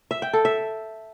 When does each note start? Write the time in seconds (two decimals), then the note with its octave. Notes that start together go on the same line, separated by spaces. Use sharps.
0.11 E5
0.22 G5
0.33 A4
0.45 E5